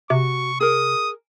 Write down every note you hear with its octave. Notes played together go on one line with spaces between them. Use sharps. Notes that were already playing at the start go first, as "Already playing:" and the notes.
C3 F#4 C#6
G#4 A#4 D#6